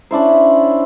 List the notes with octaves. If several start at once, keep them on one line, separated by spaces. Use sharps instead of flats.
C#4 D4 E4 C5